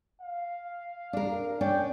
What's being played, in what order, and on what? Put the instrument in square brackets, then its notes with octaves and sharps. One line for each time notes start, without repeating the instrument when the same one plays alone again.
[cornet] F5
[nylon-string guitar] D4 A#4
[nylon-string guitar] C#4 D4 D5 [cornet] G5